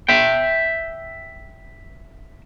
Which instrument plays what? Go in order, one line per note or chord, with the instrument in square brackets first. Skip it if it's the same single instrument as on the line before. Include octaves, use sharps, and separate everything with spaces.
[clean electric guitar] E5 G5